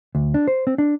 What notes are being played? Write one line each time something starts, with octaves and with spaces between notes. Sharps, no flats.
D2
D4
C5
C4
D4